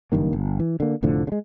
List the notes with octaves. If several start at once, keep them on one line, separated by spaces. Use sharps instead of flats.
F#1 G2 D#3 A#3
G1
E3
D3 A#3
F1 A2 D3 F3
C#3 G#3